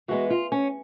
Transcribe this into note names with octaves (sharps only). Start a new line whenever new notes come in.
E3 G#3 B3 F#4
F4
C#4